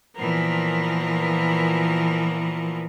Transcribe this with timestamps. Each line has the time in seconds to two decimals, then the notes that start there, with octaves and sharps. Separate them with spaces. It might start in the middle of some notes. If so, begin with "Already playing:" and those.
0.15 A#2 E3 F3 B3 A#4